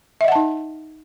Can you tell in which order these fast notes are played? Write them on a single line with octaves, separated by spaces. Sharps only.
E5 D#5 F#5 A5 D#4